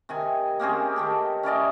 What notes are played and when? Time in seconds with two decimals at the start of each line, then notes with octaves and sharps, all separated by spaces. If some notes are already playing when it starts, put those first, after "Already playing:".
0.09 C3 D#3 G#5
0.60 A#3 C4 C#4 G#4
0.96 D#3 G4 A4
1.43 C#4 E4 D5 D#5